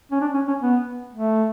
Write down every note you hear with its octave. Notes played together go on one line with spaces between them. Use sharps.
C#4
D4
C#4
C#4
B3
A3